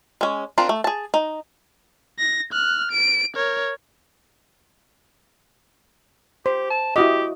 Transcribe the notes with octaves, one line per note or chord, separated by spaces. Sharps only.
G#3 C#4
C4 D4 F4 A#4
A3
G#4 A5
D#4
A#6
F6 F#6
D7
A#4 C#5
G4 C5
A5
E4 F#4 G4 D#5